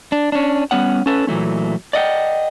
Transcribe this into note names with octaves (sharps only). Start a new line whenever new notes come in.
D4
C#4 D4
G3 B3 C#4 F#5
C#4 A4 B4
A#2 E3 F#3 A3 C#4
D5 D#5 F#5 G5